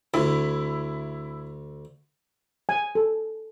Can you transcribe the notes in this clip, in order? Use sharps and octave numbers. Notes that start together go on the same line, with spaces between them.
D2 E4
G#5
A4